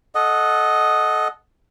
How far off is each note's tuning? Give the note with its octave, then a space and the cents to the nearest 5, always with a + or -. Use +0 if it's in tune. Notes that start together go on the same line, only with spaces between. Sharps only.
A4 -20 D#5 +0 F#5 -5